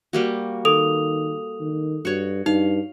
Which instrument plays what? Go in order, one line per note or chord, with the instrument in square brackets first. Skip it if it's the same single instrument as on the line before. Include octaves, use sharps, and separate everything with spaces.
[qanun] G3 A#3 F#4
[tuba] D#3 [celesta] A4 D#6 F7
[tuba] D#3
[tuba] G2 [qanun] F#4 C#5
[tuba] G2 [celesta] D#4 [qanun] F5